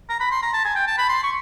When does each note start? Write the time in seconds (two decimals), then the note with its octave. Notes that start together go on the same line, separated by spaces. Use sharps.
0.09 A#5
0.20 B5
0.31 C6
0.42 A#5
0.53 A5
0.65 G#5
0.76 G5
0.87 A5
0.98 B5
1.09 C6
1.23 C#6